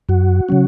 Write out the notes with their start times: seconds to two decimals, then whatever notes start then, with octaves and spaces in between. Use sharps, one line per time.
0.09 F#2 F#4
0.49 C#3 F#3 C#4